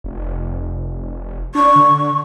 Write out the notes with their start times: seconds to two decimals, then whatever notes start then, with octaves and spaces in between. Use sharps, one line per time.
0.04 F1
1.55 D4 C#6
1.76 D3